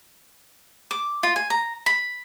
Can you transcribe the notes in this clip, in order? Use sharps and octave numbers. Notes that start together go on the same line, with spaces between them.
D6
F4
G#5
A#5
B5